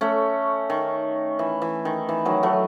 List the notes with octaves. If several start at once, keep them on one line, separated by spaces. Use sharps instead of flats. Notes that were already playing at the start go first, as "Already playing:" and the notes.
A3 C#4
D#3
E3
E3
D#3
E3
D#3 F#3
F#3 A3